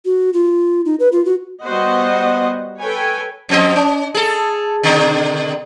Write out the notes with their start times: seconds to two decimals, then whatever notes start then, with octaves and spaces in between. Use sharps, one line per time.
0.05 F#4
0.33 F4
0.85 D#4
1.00 B4
1.12 F4
1.25 F#4
1.63 G3 B3 F#4 C5 D#5 F#5
2.80 A4 B4 C#5 G5 G#5
3.49 F2 C4 D#5
3.76 C#4
4.14 G#4 A4
4.83 B2 D3 D#3